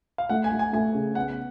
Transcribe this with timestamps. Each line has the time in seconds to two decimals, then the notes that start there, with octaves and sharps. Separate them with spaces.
0.18 F5
0.29 A3 F#5
0.44 G#5
0.51 A3
0.59 G#5
0.73 A3 G#5
0.94 C#3
1.15 B3 F#5